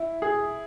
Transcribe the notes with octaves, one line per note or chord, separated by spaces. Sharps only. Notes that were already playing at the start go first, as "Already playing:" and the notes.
Already playing: E4
G#4